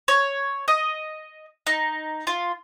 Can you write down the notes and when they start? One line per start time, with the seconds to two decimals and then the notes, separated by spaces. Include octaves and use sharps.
0.08 C#5
0.68 D#5
1.67 D#4
2.27 F4